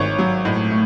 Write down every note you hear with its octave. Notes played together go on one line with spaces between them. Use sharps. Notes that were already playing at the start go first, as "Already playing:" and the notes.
Already playing: G#1 C#5
F#3
A2
A3